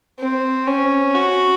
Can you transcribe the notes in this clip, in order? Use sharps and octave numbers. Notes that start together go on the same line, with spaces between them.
C4
C#4
F#4